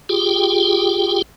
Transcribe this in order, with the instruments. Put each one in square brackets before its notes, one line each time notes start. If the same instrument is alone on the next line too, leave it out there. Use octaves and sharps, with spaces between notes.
[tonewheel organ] F4 G4 G#4 G5